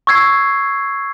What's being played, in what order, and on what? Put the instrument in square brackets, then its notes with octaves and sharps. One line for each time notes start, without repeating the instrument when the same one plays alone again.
[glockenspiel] C#6 E6 G#6 C7